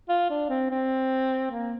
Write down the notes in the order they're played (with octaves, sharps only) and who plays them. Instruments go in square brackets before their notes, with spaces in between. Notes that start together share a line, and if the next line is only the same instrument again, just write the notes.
[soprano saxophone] F4
D4
C4
C4
A#3